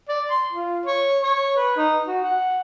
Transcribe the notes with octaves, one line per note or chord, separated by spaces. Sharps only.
D5
C6
F4
C#5
C#5
B4
D#4
F#4
F#5